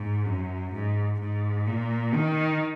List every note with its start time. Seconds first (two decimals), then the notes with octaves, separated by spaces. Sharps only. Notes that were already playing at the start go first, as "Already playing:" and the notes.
Already playing: G#2
0.26 F#2
0.73 G#2
1.20 G#2
1.67 A#2
2.14 D#3